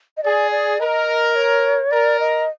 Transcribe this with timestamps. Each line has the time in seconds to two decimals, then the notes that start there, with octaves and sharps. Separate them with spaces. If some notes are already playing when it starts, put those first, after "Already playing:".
0.17 D#5
0.23 G#4 D5
0.51 D5
0.79 A#4 D#5
1.36 C#5
1.92 A#4 D5
2.20 D#5